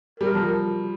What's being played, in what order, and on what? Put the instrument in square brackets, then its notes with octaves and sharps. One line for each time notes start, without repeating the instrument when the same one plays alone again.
[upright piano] G3 [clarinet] A#4
[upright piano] F3